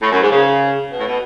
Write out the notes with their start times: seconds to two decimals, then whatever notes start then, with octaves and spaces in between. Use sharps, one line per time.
0.03 A2
0.12 F#2
0.21 G#2
0.31 C#3
0.88 B2
0.99 A2
1.08 B2